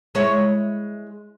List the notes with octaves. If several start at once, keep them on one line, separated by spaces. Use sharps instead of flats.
G#3 E4 C#5